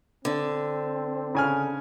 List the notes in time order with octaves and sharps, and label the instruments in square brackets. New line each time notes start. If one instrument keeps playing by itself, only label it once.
[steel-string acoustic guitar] D3 [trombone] C4
[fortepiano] C#3 G#5 F6